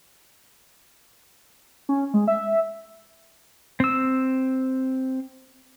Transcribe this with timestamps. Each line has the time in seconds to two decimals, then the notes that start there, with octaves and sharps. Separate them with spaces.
1.89 C#4
2.14 G#3
2.28 E5
3.80 C4 E6